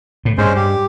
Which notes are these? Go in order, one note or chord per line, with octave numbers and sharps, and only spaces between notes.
A2
G2 G#3 C#4 C5
G4